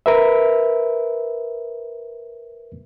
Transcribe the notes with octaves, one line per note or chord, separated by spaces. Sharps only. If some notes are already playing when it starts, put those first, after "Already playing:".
A#4 B4 E5